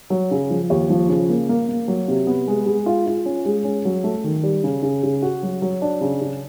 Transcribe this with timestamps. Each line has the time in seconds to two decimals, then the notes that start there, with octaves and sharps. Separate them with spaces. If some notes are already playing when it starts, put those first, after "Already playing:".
0.10 F#3
0.31 C#3
0.50 F3
0.70 D#2
0.90 F3
1.09 C#3
1.29 A#3
1.49 A#3
1.69 A#3
1.88 F#3
2.08 C3
2.27 B3
2.48 G#3
2.66 G#3
2.86 F4
3.06 F4
3.26 C#4
3.45 G#3
3.65 C#4
3.85 F#3
4.04 A3
4.24 D#3
4.43 G3
4.64 C#3
4.82 C#3
5.03 C#3
5.22 F#4
5.43 F#3
5.62 F#3
5.82 D4
6.01 C#3
6.21 C#3